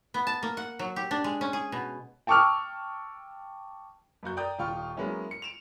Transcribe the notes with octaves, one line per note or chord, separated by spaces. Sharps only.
B3
A5
A#3
F#5
F#3
G4
D4
G#3
C#4
G#4
B2
G5 A5 C#6 D6 E6 F6
F#2 A#3 F#4 G6
D5 G5 A#5 D#6 G6
D#1 F4 G5 C#6 F6
F#3 G#3 A#3 B3 C#4 E4
C#7
D7 E7 F7